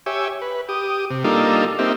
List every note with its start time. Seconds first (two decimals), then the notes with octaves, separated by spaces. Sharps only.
0.06 G4 C#5 E5 G#5
0.42 B4
0.69 G4 D#6
1.10 C3
1.24 G3 A#3 D4 D#4 F4 A4
1.79 A#3 C4 D#4 G4 E5